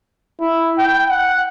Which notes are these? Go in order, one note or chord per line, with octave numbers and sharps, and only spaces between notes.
E4
G5
F#5